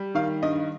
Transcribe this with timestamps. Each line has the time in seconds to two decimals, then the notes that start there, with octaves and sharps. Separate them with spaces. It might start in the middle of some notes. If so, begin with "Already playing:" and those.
Already playing: G3
0.15 D#3 F5
0.43 G2 D#5